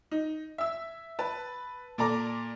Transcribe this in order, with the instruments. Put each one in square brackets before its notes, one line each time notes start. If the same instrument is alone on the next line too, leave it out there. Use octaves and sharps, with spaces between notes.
[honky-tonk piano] D#4
E5 E6
B4 A5
A#2 A4 D5 A#5 D6